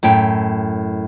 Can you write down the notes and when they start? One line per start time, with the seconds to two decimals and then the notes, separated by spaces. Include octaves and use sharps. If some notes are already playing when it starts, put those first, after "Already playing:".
0.03 F#2 A2 G5